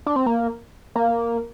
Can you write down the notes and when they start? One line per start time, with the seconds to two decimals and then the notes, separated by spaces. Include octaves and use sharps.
0.06 D4
0.16 C4
0.26 A#3
0.96 A#3